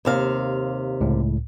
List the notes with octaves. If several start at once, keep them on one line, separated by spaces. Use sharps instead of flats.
D#2 C3 F5
C#2 A2